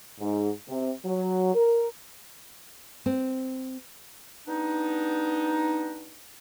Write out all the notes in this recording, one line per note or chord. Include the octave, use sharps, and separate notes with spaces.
G#2
C3
F#3
A#4
C4
G3 B3 D4 D#4